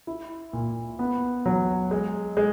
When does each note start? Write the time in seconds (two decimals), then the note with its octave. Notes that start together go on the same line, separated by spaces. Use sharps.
0.07 E4
0.53 A#2
0.99 B3
1.46 F#3
1.91 G#3
2.37 G#3